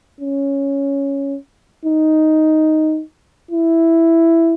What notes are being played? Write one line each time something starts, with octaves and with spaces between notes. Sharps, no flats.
C#4
D#4
E4